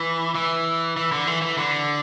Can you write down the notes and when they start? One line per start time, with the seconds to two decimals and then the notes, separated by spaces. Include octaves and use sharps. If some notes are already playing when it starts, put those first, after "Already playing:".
Already playing: E3
0.35 E3
0.97 E3
1.12 D3
1.27 E3
1.42 E3
1.58 D3